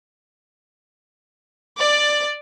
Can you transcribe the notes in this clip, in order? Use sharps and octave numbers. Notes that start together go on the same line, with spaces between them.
D5